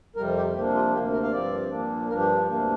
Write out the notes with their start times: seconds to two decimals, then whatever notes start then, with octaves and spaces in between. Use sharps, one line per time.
0.16 F2 C3 G3 A#4
0.36 G4
0.54 C3 F3 A#3 D4 G4
0.74 F4
0.93 D2 C3 A#3 G4
1.12 A#4
1.23 F5
1.32 G2 F3 C4 D5
1.70 A#2 F3 A#3 D4
2.09 G2 F3 D4 A#4
2.19 G4
2.47 D2 C3 A#3 D4